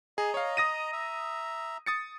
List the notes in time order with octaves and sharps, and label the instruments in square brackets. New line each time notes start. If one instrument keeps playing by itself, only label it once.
[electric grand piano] G#4 [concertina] D#5 A#5
[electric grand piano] C#5 F5
D#6 A#6 D#7
[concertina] E5 A#5
[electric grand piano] D#6 A6 C#7